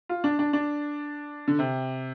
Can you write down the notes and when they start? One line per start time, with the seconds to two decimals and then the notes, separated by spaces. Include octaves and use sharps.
0.09 F4
0.24 D4
0.39 D4
0.53 D4
1.48 D3
1.59 C3